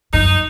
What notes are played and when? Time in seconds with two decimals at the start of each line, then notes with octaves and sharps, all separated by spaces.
0.13 F#2 D#4